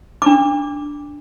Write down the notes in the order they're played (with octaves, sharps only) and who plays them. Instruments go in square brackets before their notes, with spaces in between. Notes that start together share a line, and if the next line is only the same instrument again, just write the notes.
[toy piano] D4 D6